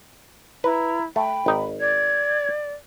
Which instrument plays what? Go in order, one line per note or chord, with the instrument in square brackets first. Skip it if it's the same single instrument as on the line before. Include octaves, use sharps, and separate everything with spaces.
[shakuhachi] E4 [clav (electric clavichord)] B4 [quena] A#5
[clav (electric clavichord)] A3 [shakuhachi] G5 [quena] B5
[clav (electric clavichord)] G#1 D#4
[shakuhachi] D5 [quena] G#6